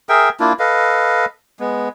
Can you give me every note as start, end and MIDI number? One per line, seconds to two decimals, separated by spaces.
0.09 0.29 68
0.09 0.29 70
0.09 0.29 76
0.09 0.29 79
0.40 0.53 58
0.40 0.53 62
0.40 0.53 64
0.40 0.53 65
0.59 1.25 69
0.59 1.25 71
0.59 1.25 75
0.59 1.25 77
1.60 1.89 56
1.60 1.89 59